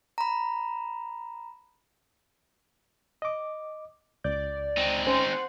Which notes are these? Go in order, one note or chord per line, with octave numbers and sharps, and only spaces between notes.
A#5 B5
D#5 D6
C#2 D5 G6
C4 D#4
C#4 C5
F#5